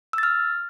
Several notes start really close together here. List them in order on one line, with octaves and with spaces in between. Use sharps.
E6 A6 F6